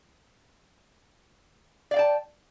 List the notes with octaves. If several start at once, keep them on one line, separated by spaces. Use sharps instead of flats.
D5 F5 G5 A5